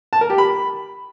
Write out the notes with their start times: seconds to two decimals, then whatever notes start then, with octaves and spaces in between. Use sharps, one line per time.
0.13 A5
0.21 A#4
0.30 G4
0.38 B5